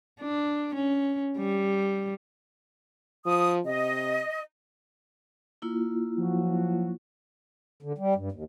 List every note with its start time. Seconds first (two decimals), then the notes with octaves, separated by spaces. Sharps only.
0.21 D4
0.75 C#4
1.38 G3
3.26 F3 D#6
3.66 C3 D#5
5.62 A#3 E4 F4
6.18 F3 F#3 F#4
7.82 D3
7.98 G3
8.15 G2
8.32 D#2